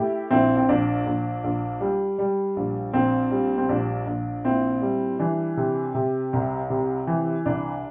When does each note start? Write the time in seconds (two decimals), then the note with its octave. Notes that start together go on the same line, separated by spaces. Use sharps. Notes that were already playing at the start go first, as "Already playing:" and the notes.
Already playing: A2 E4 G4
0.31 A#1 C4 E4
0.57 C4
0.69 A#1 D4
1.06 A#1
1.44 A#1
1.81 G3
2.19 G3
2.56 A#1
2.93 A#1 C4
3.31 G3
3.58 C4
3.69 A#1 D4
4.07 A#1
4.44 A#2 C4 E4
4.82 G3
5.19 E3 D4
5.57 C3
5.95 C3
6.33 C2
6.70 C3
7.07 E3
7.45 C2 D4